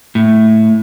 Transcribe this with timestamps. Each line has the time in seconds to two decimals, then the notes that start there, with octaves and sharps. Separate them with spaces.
0.15 A2